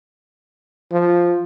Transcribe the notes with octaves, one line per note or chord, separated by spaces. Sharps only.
F3